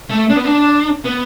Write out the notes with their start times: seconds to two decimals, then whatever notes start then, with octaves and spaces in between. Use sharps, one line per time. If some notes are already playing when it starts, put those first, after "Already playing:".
0.10 A3
0.29 D4
0.36 B3
0.45 D4
1.04 B3